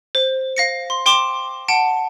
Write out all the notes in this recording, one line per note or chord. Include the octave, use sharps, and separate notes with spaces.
C5
F5 A#6 C#7
C6
G5 C6 D6 E7
F#5 A5 D7